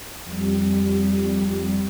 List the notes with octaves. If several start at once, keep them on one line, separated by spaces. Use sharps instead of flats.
F2 G3